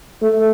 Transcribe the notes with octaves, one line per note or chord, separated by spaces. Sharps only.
A3